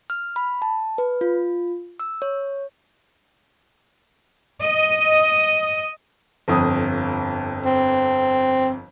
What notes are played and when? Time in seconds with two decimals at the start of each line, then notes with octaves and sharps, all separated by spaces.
0.10 F6
0.36 B5
0.62 A5
0.98 B4
1.21 F4
2.00 E6
2.22 C#5
4.61 D#5
6.48 G1 F2 D#6
7.65 C4